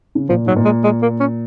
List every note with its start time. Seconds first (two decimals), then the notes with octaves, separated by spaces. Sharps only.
0.15 C#3
0.29 A#2 F3
0.45 G#2 F#3
0.56 A#2
0.65 G#3
0.84 G#3
1.02 A#3
1.20 C#4